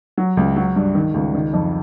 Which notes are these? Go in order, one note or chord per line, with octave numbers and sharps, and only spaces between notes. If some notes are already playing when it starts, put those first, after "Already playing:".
F#3
C#2
F#3
G2
D#3
C#2
D#3
F2